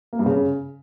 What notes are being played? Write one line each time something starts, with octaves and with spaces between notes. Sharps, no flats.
A#3
G2
C#3